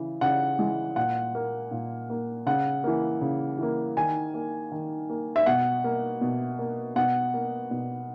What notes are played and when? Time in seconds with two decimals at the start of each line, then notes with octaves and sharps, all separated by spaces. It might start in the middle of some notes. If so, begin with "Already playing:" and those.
Already playing: C#3 E3
0.21 C#3 F#5
0.59 E3 G#3
0.96 A#2 F#5
1.35 A#3
1.71 A#2
2.10 A#3
2.46 C#3 F#5
2.84 E3 A#3
3.21 C#3
3.59 E3 A#3
3.97 D#3 G#5
4.34 A#3
4.71 D#3
5.10 A#3
5.36 E5
5.46 B2 F#5
5.84 A#3
6.21 B2
6.59 A#3
6.96 B2 F#5
7.34 A#3
7.71 B2